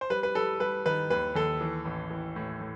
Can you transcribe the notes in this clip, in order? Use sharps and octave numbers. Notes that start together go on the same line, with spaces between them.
C5
G3 B4
B4
G3 A4
G3 B4
D#3 B4
D#2 B4
D#2 A4
E3
A1
E3
A2
A2